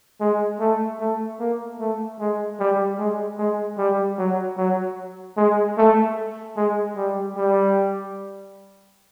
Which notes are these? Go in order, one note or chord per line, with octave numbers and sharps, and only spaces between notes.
G#3
A3
A3
A#3
A3
G#3
G3
G#3
G#3
G3
F#3
F#3
G#3
A3
G#3
G3
G3